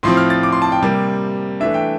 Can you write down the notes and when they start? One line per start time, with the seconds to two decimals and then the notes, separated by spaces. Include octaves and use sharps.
0.03 A2 F3 C4 C6
0.17 F6
0.30 A6
0.43 D6
0.52 C6
0.62 A5
0.72 G5
0.82 C3 G3 A#3
1.60 E3 A3 D4 E5
1.74 G5